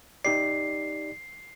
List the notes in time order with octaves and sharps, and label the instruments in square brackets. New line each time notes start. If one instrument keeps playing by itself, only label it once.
[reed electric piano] D#4 G4 D5 [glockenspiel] C7